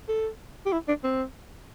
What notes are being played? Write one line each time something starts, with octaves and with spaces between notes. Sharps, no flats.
A4
G4
E4
D4
C4